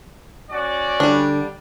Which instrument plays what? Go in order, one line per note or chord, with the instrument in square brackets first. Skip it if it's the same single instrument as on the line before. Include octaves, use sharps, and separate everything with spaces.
[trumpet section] C#4 F#4 D5
[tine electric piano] D3 [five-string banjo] G3 D4